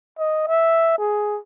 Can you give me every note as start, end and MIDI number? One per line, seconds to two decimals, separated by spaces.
0.19 0.47 75
0.47 0.96 76
0.98 1.39 68